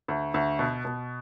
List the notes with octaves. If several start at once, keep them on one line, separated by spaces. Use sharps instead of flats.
D2
D2
B2
B2